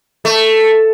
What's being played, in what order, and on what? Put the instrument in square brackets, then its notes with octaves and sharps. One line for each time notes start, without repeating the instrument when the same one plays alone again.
[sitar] A3